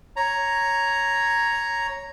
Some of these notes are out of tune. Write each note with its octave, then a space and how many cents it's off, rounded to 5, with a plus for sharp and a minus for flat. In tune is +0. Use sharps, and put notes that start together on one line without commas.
C#5 +0 A#5 +0